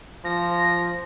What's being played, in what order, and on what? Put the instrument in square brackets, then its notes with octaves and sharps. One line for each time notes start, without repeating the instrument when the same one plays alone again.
[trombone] F3 [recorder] A#6